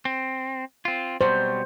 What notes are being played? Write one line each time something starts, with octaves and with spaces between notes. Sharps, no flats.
C4
C4 F4
B2 F#3 G3 C5